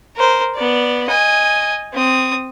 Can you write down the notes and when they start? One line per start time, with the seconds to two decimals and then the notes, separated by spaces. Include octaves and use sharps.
0.16 A#4 C5
0.55 B3 D5
1.08 D#5 G#5
1.93 C4 D#6